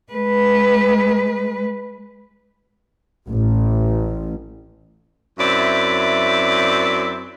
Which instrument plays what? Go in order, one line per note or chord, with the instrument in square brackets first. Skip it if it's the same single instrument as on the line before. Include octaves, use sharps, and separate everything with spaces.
[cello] G#3 B4
[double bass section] A1
[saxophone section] F#2 C4 E4 D5 E5